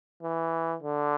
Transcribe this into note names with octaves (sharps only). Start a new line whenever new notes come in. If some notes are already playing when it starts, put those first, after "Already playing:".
E3
D3